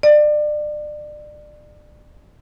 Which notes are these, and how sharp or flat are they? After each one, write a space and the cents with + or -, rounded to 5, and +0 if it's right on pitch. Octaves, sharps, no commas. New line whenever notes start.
D5 +30